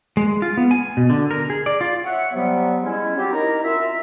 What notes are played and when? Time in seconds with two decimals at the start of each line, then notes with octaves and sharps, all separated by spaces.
0.17 G#3
0.42 F4
0.57 B3
0.71 G#5
0.97 B2
1.10 D3
1.31 A#4
1.50 G#4
1.66 D5
1.81 F4
2.04 C#5 E5 F#5
2.33 C3 F#3 G3 B3
2.83 G#3 C#4 E4
3.16 F#3 C4 F4 G4
3.32 D#4 E4 A#4 A#5
3.63 F#2 F4 E5